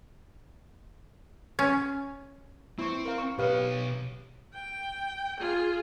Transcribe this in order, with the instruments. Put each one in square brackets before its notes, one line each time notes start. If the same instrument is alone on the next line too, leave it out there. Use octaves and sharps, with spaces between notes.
[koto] C#4
[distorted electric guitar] C4 [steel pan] E4 C#6
[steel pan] A#4 F5
C#6
[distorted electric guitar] B2 C#5 [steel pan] G4 B4 F5
[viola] G5
F4 G#4